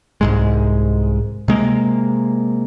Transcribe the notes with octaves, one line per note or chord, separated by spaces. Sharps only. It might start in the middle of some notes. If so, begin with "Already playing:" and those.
C2 G#2 G#3
C3 G#3 A#3